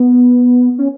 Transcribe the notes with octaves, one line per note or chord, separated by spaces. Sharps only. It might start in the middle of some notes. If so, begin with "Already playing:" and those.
Already playing: B3
C#4